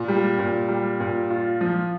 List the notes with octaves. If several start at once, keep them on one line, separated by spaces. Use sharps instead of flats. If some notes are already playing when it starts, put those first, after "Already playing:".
Already playing: A#2
G3
A#2
G3
A#2
F4
F3